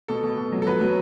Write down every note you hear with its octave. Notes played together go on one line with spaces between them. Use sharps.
B2 A4
B2
B2
F#3
A4
F#3 B4
F#3